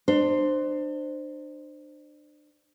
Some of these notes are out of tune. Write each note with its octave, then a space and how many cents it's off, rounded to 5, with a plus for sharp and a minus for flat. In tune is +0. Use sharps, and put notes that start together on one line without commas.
D4 +35 C5 +0